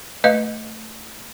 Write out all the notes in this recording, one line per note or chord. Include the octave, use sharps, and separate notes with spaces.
A3 B4 D#5 F5